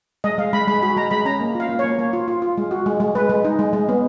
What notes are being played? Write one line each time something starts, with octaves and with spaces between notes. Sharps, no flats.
G#3 D#5
G#3 F5
G#3 B5
G#3 B5
F#4 B5
G#3 A#5
G#3 B5
C#4 A#5
A#3
F4
F5
A#3
A#3 C#5
A#3
F4
F4
F4
G#3
F#4
G#3
G#3
G#3 B4
G#3
D#4
G#3
G#3
B3